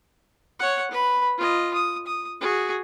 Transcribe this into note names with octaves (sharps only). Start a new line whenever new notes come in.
C#5 F#5
B4 B5
F4 D#5
D#6
D#6
F#4 G#4